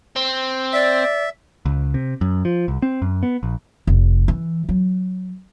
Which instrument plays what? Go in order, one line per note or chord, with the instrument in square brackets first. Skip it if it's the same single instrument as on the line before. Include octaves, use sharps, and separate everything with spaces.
[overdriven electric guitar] C4
[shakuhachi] D5 [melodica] E5
[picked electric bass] C#2
C3
F#2
F3
C2
C4
F#2
B3
A#1
[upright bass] F1
E3
F#3